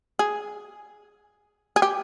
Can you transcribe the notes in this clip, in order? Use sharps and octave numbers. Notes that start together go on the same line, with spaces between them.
G#4
G#4
G4